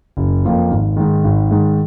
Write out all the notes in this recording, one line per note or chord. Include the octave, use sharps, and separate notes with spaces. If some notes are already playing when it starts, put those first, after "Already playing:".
F#1
F2 F3 A#3 F4
G#1
G#2 D#3
G#1
G#2 D#3